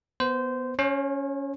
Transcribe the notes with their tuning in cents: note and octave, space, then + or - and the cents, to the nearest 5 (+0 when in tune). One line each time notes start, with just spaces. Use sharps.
B3 +0 C5 -20
C#4 +10 C#5 -40